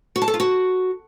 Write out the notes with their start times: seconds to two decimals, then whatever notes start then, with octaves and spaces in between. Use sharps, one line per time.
0.16 F#4
0.22 A5
0.28 A4
0.34 F4
0.40 F#4